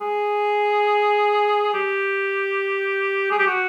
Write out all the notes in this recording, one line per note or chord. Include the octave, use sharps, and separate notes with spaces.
G#4
G4
G#4
G4
F#4